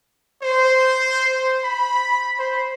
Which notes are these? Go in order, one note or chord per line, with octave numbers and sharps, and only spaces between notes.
C5
B5
C5